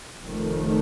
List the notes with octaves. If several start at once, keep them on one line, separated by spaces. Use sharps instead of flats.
F1 F2 C3 D#3 A3